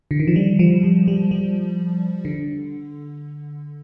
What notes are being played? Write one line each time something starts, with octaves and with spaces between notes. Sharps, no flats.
D3
D#3
F3
G3
F3
G3
G3
G3
D3